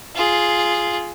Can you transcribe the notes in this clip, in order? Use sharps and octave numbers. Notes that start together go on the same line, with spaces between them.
F4 G#4